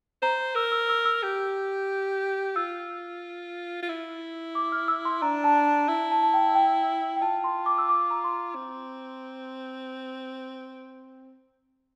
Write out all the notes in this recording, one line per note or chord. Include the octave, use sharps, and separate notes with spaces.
C5 A#5
A#4 E6
E6
E6
E6
G4
F4 E6
F4
E4
D6
F6
E6
C6
D4 A#5
A5
E4
A5
A5
G5
G5
G5
F4 A5
C6
D6
E6
D6
A#5
C6
A#5
C4